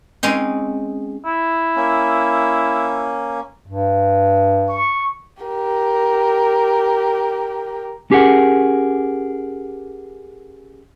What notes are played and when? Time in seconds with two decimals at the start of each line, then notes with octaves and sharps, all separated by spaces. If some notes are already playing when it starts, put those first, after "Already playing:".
0.23 G#3 C4 C#4 D#4
1.25 E4
1.76 A#3 C#4
3.68 G2
4.69 C#6
5.42 G4 A#4
8.11 C#4 G4 G#4 A#4 F#5